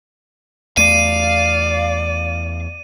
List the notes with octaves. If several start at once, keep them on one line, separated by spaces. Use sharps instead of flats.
E2 A3 D5 F5 D#7